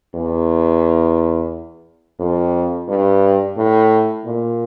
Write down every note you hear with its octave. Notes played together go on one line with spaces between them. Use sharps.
E2
F2
G2
A2
A#2